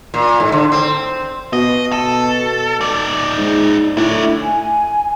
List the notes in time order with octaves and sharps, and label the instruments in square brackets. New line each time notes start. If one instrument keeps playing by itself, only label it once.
[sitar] A#2
G#2
D3
C4
[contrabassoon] B2 [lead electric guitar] D#5
[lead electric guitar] A4
D#4 D5
[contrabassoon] G#2
[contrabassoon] A2 [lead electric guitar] D4 E4
[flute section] G#5